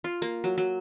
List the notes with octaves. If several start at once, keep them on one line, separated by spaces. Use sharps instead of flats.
F4
A#3
F#3
F#3